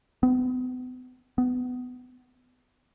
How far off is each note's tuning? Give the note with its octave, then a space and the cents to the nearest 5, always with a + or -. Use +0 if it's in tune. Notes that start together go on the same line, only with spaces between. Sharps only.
B3 +40
B3 +20